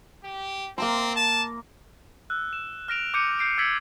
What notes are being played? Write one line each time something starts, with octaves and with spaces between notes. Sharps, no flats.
G4
A#3 C4 A#5 C6
A5
E6 F#6
E7
F6 A#6 D7 F7
D6 G6 C#7 D#7
G6 C7 D7
E6 G#6 A6 B6 C#7 F#7